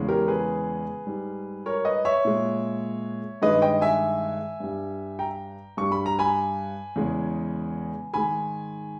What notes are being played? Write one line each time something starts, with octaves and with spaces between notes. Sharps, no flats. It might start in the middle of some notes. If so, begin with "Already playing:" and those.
Already playing: E2 C#3 G#3
G4 A#4
G#4 B4
G#2 G3
A#4 C#5
B4 D#5
C#5 E5
A#2 G#3
G2 D#3 G#3 B4 D#5
D#5 G5
E5 G#5
G2 G3
G5 A#5
G2 G3 C#6
B5
A#5
G#5 B5
E2 C#3 G#3
G#2 D#3 G#3 G#5 B5